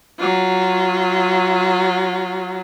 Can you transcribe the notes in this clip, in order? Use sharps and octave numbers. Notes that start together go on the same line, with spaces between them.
F#3 F4